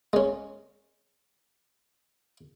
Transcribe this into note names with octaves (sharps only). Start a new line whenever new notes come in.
G#3 C#4